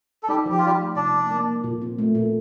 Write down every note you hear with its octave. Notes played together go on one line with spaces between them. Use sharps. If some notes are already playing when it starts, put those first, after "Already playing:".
A4
G3 D#4 G4
F3
G4
F4
F3 G3 G4
A3
C3 D4 D5
A#3
A#3
G3
A#2
C4
A3
A#2